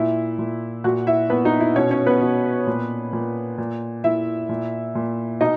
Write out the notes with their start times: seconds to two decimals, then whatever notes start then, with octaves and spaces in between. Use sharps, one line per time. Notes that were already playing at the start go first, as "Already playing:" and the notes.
Already playing: A#2 E4 E5
0.39 A#2
0.84 A#2 F#4 F#5
1.07 E4 E5
1.30 A#2 B3 B4
1.45 D#4
1.60 E4
1.75 B2 C#4 C#5
1.91 C#4 C#5
2.06 B3 B4
2.21 B2
2.67 A#2
3.13 A#2
3.58 A#2
4.04 A#2 E4 E5
4.49 A#2
4.95 A#2
5.41 B2 D#4 D#5